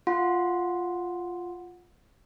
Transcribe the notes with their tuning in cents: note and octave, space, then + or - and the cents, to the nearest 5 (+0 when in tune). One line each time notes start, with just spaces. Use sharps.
F4 +0 F#5 -15 C6 +0